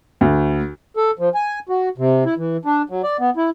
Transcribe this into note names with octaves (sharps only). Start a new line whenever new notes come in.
D2
A4
F3
G#5
F#4
C3
E4
E3
D4
F#3
D5
B3
E4